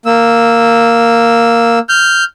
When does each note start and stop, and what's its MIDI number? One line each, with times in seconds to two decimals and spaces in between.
0.06 1.79 58
0.06 1.79 88
1.89 2.24 89
1.89 2.24 91